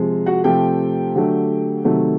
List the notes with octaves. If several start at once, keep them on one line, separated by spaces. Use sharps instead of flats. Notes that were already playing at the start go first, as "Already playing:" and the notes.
Already playing: C3 F3 G#3
F#4 F#5
C3 F3 A3 G4 G5
D3 F#3 A3
C3 D#3 F#3 A3